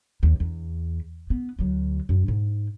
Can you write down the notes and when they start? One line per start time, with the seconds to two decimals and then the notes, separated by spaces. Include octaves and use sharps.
0.23 D#2
0.40 E2
1.30 B3
1.59 D2 F#3
2.09 F#2
2.28 G#2